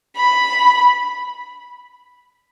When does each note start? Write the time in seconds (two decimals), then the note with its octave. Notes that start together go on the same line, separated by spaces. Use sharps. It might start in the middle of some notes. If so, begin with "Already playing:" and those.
0.16 B5